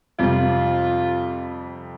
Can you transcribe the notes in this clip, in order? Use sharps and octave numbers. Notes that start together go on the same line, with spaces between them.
F2 C3 G3 F4